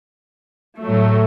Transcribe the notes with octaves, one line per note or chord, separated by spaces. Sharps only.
A2 F#3 A3